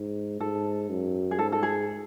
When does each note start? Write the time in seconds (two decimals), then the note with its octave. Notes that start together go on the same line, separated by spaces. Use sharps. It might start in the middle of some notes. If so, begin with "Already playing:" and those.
Already playing: G#2
0.40 G#2 A4
0.90 F#2
1.31 G#4
1.39 G#2 A4
1.52 A4
1.63 G#4